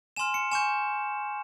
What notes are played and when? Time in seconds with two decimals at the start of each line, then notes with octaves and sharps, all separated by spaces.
0.16 G#5 C6 F6 E7
0.34 C#7
0.51 G#5 C#6 G6 E7